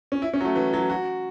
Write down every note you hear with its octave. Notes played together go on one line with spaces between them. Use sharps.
C#4
E4
C#4
F#3
A3
E3
F#3
F#4